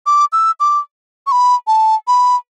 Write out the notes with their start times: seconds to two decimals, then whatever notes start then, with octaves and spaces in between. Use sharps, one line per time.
0.06 D6
0.32 E6
0.60 D6
1.27 C#6
1.32 B5
1.67 A5
2.08 B5